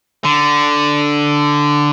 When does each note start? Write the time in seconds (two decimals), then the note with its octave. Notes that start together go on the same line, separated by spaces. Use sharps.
0.24 D3